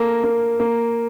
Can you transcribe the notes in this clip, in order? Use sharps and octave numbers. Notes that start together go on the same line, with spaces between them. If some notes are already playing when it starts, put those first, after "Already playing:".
Already playing: A#3 A4
A#3
A#3